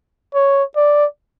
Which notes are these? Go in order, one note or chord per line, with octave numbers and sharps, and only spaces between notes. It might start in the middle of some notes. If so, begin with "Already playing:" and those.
C#5
D5